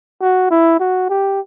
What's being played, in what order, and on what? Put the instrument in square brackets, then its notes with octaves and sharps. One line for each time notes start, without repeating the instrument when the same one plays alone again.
[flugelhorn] F#4
E4
F#4
G4